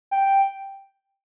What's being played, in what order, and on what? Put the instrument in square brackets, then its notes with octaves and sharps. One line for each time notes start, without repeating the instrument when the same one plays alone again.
[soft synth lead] G5